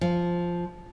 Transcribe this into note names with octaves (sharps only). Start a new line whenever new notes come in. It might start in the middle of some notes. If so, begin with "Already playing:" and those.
F3